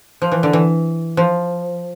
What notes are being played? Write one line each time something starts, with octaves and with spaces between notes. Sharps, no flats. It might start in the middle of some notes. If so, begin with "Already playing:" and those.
F3
E3
D3
E3
F3